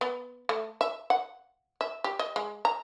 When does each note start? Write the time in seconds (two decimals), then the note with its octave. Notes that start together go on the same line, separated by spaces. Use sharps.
0.01 B3
0.49 A3
0.81 E5
1.10 F#5
1.81 E5
2.04 G4
2.19 D#5
2.36 G#3
2.65 A#5